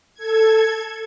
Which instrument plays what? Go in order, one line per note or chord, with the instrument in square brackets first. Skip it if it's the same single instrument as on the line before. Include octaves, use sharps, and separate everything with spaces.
[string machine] A4 G#6